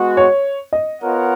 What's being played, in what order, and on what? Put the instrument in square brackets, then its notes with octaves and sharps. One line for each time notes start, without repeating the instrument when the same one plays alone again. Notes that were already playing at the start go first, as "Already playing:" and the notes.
Already playing: [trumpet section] G#3 B3 F#4
[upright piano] C#5
D#5
[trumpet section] B3 F4 A#4 C#5 F#5